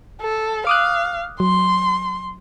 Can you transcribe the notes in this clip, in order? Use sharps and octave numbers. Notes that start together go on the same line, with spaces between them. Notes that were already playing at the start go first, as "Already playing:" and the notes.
A4
F5 D6 D#6 F#6
F#3 C6